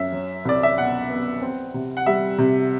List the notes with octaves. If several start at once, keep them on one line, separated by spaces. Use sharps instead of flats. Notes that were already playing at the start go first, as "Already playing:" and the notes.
Already playing: F#2 E5
F#3
C2 D5
E5
B2 F#5
B3
C4
C3
F#5
G3 E5
C3